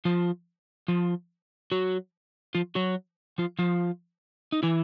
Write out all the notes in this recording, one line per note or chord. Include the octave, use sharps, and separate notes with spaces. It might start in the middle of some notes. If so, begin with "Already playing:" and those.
F3 F4
F3 F4
F#3 F#4
F3 F4
F#3 F#4
F3 F4
F3 F4
D#4
E3 E4